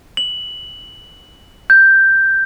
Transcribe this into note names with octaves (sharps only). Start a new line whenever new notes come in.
F#7
G6